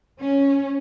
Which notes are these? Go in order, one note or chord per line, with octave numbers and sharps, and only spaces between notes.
C#4